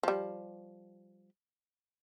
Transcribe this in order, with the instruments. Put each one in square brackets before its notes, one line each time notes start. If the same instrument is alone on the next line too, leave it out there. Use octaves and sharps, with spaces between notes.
[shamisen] F3 G3